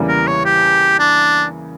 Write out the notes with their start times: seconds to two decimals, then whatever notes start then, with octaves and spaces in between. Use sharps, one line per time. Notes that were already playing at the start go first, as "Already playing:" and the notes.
Already playing: E2 C#3 E3 G3 A#3
0.08 A#4
0.27 C#5
0.45 G4
0.99 D4